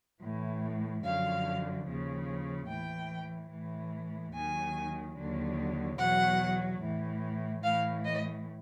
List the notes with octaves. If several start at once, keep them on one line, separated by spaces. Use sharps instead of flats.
A2 E3
F#2 D3 F3 F5
D#2 C#3 F3
A2 E3 G5
A2 E3
D#2 D#3 F#3 G#5
D#2 D3 F#3
E2 B2 F#3 F#5
A2 E3
A2 E3 F5
D#5